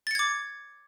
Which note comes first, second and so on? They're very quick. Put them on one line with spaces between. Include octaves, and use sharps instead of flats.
A6 C#7 G#6 D6